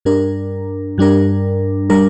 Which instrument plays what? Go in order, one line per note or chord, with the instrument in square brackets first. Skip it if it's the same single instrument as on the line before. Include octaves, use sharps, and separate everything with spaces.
[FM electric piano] G2 G3 D4 A#4
G2 G3 D4 A#4
G3 D4 A#4